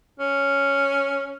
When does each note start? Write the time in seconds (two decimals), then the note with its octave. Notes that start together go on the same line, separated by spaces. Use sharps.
0.20 C#4